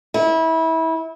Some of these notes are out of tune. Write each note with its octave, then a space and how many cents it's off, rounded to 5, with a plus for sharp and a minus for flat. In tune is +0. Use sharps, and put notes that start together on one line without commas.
E4 -25